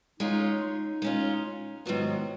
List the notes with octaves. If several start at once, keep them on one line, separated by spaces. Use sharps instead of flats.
G#3 C#4 D#4 F4
G#3 C#4 F4
G#2 D#3 F#3 B3 F4